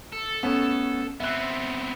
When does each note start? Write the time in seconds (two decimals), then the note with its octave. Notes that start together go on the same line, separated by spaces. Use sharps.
0.13 A4
0.43 A3 B3 C#4
1.20 B3 C4 E5 F#6